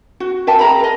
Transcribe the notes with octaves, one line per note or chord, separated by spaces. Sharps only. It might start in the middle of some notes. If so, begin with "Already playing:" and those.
F#4
A#4 E5 G5 A5
G#4 A#5 B5
A#4 D#5